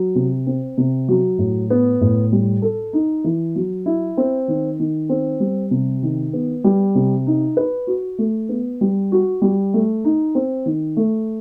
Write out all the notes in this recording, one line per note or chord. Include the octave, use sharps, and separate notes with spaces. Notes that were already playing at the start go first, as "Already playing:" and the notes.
Already playing: F#3
C3
C4
C3
F#3
A2
B3
A2
G3
A4
D#4
E3
F#3
E4
C4
D#3
D#3
C4
G3
C3
D#3
B3
G3
C3
D#4
B4
F#4
A3
B3
G3
F#4
G3
A3
D#4
C4
D#3
A3